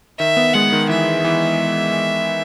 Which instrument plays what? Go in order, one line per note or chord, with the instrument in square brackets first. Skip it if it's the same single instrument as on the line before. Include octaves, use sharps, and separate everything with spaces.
[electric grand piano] D#3 [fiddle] E5
[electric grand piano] B3
[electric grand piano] G#3 [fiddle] F#5
[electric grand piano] D#3
[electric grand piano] E3 [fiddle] E5
[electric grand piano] E3